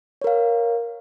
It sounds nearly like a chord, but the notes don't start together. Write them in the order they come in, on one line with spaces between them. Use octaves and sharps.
C#5 A#4 F5